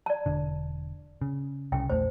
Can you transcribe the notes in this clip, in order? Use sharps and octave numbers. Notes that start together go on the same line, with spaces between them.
D5 A5
E1 D3
C#3
C2 C#3 G5
A#1 E2 A3 C5